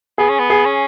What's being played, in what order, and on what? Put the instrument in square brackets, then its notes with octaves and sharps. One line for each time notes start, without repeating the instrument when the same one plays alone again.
[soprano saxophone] B3 [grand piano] G#4
[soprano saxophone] C#4
B3
[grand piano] G#4
[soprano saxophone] C#4